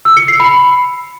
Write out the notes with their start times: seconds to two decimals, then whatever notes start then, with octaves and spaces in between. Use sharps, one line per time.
0.05 E6
0.17 C#7
0.28 C7
0.40 B5